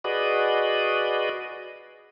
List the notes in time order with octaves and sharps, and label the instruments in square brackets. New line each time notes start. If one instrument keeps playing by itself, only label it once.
[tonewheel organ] F#4 G#4 B4 D5 D#5